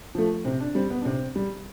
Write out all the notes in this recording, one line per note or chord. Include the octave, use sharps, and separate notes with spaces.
F3 A3
C3 C4
D4
G3 C4
B3
D4
C3 C4
G3